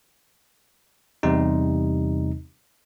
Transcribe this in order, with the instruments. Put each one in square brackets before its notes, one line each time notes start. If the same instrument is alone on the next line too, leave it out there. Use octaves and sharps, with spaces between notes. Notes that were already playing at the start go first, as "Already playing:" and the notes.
[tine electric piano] E2 C3 G3 D#4